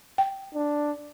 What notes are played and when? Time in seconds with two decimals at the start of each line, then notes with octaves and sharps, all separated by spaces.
0.18 G5
0.55 D4